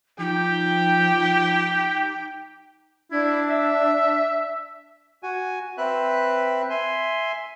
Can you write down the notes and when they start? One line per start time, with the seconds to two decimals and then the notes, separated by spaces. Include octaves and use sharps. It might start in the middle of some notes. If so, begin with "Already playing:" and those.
0.20 F3 D#4 G4 G5
3.11 D4 E4
3.48 E5
5.23 F#4 G#5
5.78 C4 B4 E5 F#6
6.70 E5 G#5 C6